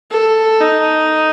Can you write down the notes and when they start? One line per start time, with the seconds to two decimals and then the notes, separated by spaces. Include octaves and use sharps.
0.11 A4
0.60 D#4